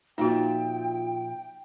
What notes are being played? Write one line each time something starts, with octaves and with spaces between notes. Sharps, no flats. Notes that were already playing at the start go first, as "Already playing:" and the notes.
A#2 F3 D#4 F#4 E5 G5